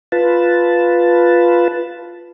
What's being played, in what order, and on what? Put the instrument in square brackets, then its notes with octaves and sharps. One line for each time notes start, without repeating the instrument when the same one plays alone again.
[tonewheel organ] F4 B4 A5